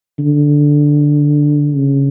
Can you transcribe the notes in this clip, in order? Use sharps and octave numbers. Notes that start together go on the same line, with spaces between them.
D3
C#3